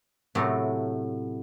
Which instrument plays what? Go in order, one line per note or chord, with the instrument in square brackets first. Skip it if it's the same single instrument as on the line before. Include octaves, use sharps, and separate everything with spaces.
[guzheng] A2 C3 F#3 A3